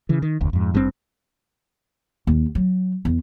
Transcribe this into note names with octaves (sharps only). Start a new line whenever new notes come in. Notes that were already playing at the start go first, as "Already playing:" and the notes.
C#3 E3
D#3
F1 D2
F2 G#2
G#1 G2 D#3 C4
D#2
F#3
E2